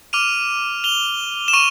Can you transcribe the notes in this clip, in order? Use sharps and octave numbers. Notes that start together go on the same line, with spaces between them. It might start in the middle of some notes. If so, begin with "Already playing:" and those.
D6 F6 D#7 F7
F7 G7
E7
C#6 D#7 F7